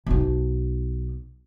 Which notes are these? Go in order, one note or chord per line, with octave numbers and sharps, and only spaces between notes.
B1 D#4